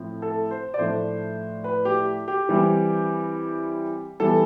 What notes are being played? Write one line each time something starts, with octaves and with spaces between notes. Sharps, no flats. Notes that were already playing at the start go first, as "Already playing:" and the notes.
Already playing: A2 F3 C4
A4
C5
D5
A2 F3 A3 D4 C5
B4
G4
G4
E3 G3 C4
E3 G3 B3 A4